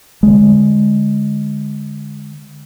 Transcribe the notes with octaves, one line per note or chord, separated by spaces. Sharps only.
D3 G#3